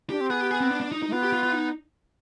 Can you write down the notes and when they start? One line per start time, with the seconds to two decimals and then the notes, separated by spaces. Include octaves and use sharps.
0.10 D4 G4
0.21 C4
0.30 B3 G#4
0.41 G4
0.51 G#4
0.60 C4
0.71 D4
0.81 D4
0.92 D#4
1.02 D#4
1.07 G#3
1.12 B3 F4
1.23 G4
1.33 F4
1.43 F4
1.53 D#4